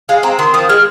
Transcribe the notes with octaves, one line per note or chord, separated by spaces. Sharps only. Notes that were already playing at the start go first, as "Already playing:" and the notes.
G#3 F5
C4 A#5
D#3 C6
F3 D#6
G#3 F6